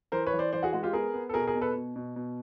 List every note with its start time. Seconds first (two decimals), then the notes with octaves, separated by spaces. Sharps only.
0.12 E3 A#4 C5
0.27 B4 C#5
0.33 E3
0.39 C5 D5
0.53 E3 C5 D5
0.63 F#4 G#4
0.73 G#3 F#4
0.83 F4 G4
0.93 B3 G#4 A#4
1.14 B3
1.29 A4
1.34 B2 G#4 A#4
1.47 G#4 A#4
1.55 B2
1.61 A4 B4
1.75 B2
1.96 B2
2.16 B2